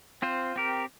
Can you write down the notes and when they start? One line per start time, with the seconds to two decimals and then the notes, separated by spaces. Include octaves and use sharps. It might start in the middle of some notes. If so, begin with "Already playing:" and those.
0.22 C4 F4 C5
0.56 C4 G4 A#4